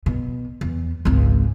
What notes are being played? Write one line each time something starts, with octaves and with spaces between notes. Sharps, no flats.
B2
E2
G#1 C#2